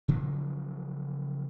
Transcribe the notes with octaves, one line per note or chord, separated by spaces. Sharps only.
C#3 F3 F#3 A#3